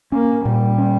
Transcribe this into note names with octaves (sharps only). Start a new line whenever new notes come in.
A#3 C#4
A#2 G3
C#4